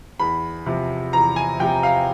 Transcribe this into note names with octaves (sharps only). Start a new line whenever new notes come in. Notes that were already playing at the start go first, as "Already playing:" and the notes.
E2 B5
C3 F3
E2 A#5
G#5
C3 F3 G5
F5